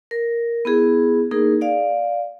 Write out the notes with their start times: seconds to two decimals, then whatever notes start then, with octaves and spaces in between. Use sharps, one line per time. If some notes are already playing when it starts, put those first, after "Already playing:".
0.11 A#4
0.65 B3 E4 G#4
1.31 A#3 D#4 G#4 A#4
1.61 D5 F5